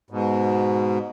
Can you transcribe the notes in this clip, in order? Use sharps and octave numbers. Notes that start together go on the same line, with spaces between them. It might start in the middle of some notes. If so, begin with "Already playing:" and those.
G#2 B2